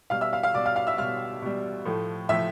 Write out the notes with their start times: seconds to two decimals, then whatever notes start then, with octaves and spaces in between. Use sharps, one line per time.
0.10 B2 G3 F5 F6
0.21 E5 E6
0.33 F5 F6
0.43 F5 F6
0.54 B2 G3 D5 D6
0.66 F5 F6
0.76 F5 F6
0.87 E5 E6
0.98 B2 G3 F5 F6
1.42 B2 G3
1.85 A2 F3 A3
2.29 A2 F3 A3 E5 E6